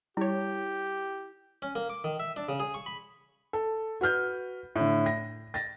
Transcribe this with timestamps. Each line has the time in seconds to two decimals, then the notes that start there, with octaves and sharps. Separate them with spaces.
0.17 G3 E4 G4 C#5
1.62 C#4
1.75 A#3
1.89 D6
2.04 D#3
2.20 E5
2.36 D4
2.49 C#3
2.60 G#4
2.74 C#6
2.86 B5
3.53 A4
4.01 F#4 B4 F6 G6
4.76 A2 D3
5.06 A#6
5.54 A6 A#6